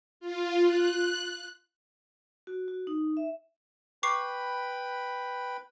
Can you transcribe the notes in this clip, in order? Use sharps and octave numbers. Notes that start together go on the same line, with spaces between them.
F4
F#6
F#4
F#4
D#4
E5
B4 G5 B5 C#6 D6 C7